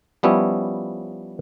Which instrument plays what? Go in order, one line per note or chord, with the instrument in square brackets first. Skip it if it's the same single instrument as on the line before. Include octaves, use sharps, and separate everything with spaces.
[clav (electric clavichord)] F3 G3 B3 C#4 E4